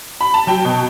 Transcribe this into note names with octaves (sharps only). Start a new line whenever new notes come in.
B5
A5
F#3 G5
B2